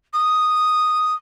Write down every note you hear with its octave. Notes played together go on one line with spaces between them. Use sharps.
D#6